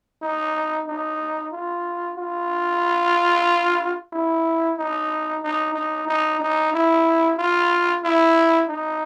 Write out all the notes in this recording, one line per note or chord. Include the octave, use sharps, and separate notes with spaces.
D#4
D#4
F4
F4
E4
D#4
D#4
D#4
D#4
D#4
E4
F4
E4
D#4